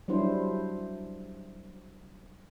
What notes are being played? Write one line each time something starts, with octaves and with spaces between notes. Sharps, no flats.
F#3 G3 D4 E4 C5